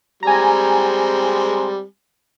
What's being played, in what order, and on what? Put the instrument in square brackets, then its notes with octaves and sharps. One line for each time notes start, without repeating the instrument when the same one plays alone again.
[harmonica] G3 G#3 C4 [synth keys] G#5 A#5